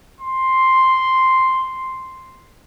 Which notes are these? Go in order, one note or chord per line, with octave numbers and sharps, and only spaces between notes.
C6